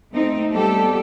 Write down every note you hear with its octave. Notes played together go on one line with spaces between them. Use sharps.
A3 C4 D#4
G3 A3 B3 G4 A4